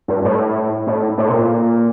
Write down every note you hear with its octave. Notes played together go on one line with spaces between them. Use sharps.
G2
A2
A2
A2
C3
A#2